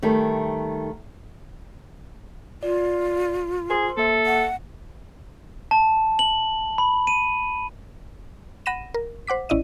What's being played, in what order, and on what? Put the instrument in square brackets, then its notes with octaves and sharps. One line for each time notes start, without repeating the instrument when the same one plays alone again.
[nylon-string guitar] D#3 G3 A3
[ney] F4 [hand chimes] D5
[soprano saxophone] G#4 [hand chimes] A#4 C5 C6
[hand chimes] A#3 E5 [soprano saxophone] A4
[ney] F#5
[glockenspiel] A5
F#7
B5
D#7
[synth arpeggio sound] F#5 B5 A#6 D#7 E7
A#4
C5 F#5 D6 B6
A1 C#4 E4 D5 D#5 D#7